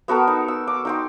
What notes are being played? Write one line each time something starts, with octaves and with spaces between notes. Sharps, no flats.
B3 F#4 A4 A#4
D#4
E6
D6
D#4 G5 C6